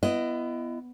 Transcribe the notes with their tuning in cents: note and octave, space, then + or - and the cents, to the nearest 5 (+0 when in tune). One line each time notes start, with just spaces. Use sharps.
B3 +5 E4 +30 D#5 +0